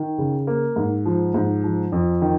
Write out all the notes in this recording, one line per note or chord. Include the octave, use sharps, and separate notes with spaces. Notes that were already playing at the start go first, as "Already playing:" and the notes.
Already playing: D#3
C#3
A#3
G#2
F3
G#2
F3
F2
D#3